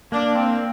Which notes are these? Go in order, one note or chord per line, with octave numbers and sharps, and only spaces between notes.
A#3 D4
C4